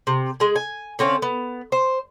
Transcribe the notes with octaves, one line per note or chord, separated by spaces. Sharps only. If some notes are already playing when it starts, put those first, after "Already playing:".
C3
G#3 G#4
G#5
D3 C4 C#4 F5
B3
C5